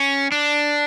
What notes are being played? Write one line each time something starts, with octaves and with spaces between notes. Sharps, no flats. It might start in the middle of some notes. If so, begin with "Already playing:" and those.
Already playing: C#4
D4